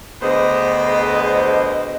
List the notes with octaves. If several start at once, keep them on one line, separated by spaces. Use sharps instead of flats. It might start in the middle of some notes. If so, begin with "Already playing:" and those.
D2 B3 G#4 C5 D#5